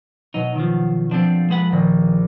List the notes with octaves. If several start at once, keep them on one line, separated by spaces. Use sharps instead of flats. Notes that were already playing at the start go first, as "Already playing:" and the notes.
B2 F#3 D#4
D#3 F3
F3 C4 D4 A4
G#3 B4 F#5
A#1 A#2 D#3 A#6